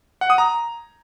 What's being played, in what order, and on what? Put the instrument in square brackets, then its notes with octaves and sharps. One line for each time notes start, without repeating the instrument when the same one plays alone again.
[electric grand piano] F#5
D#6
A#5